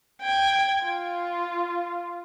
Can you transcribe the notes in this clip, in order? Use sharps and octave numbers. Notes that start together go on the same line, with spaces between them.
G5 G#6
F4